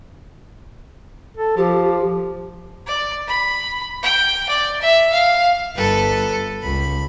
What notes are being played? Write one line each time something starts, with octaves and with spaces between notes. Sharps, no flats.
A4
F3 G4
D5
B5
G5
D5
E5
F5
G1 A4 B4
C#2 B5